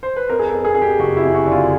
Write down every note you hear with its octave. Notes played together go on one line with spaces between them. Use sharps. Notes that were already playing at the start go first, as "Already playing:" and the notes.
C5
B4
F2 A#4
G#4
A4
F2
G#4
F2 G#4
G4
F#1 F#4
E4
F2
F#4
D3
F4